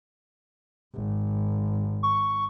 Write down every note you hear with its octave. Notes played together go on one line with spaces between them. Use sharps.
G#1
C#6